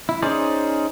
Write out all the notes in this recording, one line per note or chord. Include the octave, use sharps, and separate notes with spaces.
E4
C#4 D#4 G#4 C5 D5